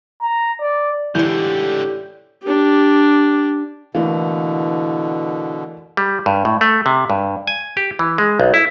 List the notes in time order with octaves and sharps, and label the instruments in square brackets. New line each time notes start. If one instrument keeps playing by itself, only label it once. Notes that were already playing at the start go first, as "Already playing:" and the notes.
[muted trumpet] A#5
D5
[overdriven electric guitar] C#2 D3 [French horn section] A2 G4 [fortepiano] E3 [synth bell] D5 G6
[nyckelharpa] D4 G4
[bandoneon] B2 D3 [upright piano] E3 A3 A#3 [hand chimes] E4 F5
[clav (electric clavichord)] G3
G2
A2
A3
C3
G2
G#5
G4
E3
G#3
B1
E4